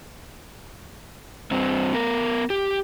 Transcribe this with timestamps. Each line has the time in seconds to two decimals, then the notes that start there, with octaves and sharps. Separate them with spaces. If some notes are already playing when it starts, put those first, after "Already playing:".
1.51 G2 C4
1.94 B3 A#4
2.50 G4